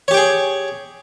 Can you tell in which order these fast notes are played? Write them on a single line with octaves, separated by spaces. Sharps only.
C#5 G4 G5 G#4